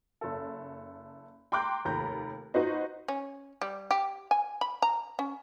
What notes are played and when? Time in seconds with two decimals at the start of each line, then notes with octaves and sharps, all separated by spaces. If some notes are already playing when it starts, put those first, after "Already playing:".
0.21 F#1 A4
1.52 G5 A#5 C6 D6 F#6 G6
1.85 F1 D#2 A#5 B5 G6
2.54 D#4 F4 F#4 B4 C5 D#5
3.08 C#4
3.62 G3
3.91 G4
4.31 G#5
4.61 B5
4.82 A#5
5.19 C#4